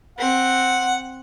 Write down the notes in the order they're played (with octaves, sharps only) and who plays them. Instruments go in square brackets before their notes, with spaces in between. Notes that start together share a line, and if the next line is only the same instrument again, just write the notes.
[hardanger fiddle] C4 [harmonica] F#5